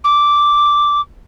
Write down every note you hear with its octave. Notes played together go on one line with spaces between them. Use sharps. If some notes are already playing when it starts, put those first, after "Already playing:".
D6